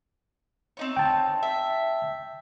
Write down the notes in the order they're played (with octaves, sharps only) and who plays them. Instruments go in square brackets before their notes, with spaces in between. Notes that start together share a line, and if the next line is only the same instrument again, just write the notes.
[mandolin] C4 D#4 C#5
[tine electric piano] G5 A5
[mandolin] E5